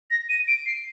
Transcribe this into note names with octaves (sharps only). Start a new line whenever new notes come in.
A#6
D#7
D7
C7